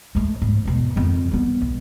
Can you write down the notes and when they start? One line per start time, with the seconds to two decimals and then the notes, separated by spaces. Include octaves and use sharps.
0.15 G#3 A3
0.42 G#2
0.65 E2 B2
0.96 F2 D#3
1.31 G3 B3
1.61 B1